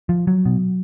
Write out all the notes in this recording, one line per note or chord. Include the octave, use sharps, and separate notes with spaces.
F3
F#3
B2